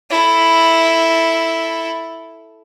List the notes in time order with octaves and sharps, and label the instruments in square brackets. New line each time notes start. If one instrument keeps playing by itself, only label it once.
[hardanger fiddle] E4 A4